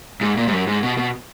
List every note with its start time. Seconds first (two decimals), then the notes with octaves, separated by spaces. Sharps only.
0.21 G#2
0.37 A#2
0.47 G#2
0.52 F#2
0.67 G#2
0.83 B2
0.97 B2